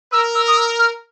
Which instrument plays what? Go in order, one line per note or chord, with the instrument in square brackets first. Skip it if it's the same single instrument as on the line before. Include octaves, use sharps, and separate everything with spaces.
[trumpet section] A#4 [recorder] E6
[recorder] E6
D#6
E6
F6